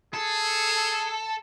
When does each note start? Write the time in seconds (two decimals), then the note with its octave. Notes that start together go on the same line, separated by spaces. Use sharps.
0.14 G#4 A4